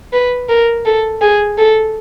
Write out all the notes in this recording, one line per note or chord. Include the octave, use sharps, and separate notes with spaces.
B4
A#4
A4
G#4
A4